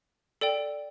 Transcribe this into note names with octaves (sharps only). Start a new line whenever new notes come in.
A4 D5 G5